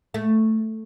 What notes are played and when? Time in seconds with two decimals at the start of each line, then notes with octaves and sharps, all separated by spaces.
0.14 A3